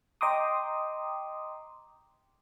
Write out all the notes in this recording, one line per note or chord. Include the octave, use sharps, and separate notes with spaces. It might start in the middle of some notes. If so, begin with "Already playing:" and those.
D#5 G5 A#5 C6 D6 D#6